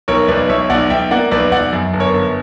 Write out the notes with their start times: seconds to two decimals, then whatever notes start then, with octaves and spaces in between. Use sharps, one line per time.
0.08 B1 A#4 C#5
0.28 B1 B4 D5
0.49 B1 C#5 E5
0.70 B1 D5 F#5
0.90 B1 E5 G5
1.11 A#3 D5 F#5
1.31 B1 B4 D5
1.52 B1 D5 F#5
1.73 F#2
1.93 G1
2.00 A#4 C#5
2.14 G1